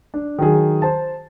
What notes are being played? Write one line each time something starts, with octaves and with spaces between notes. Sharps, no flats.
D4
D#3 F#3 G#4
C5 A5